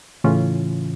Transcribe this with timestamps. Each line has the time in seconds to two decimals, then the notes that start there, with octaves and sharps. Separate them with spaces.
0.24 A2 C#3 E3 C#4 F4